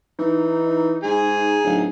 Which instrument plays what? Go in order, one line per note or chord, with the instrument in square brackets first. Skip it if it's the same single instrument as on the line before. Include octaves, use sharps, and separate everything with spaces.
[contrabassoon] E3 [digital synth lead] D#4
[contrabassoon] G#2 [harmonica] G#4
[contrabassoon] D1